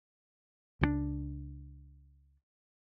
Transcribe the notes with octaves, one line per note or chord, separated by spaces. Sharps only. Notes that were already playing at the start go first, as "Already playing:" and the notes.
C#2 F3 D4